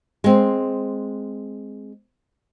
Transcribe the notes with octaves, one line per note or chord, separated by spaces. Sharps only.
G#3 C4